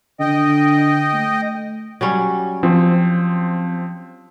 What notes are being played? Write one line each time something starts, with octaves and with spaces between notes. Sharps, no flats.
D3 D#5 G5
A3
F#3 G3 C#4
F3 C4